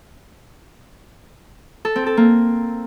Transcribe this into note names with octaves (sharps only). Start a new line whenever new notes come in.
A4
C4
A4
A#3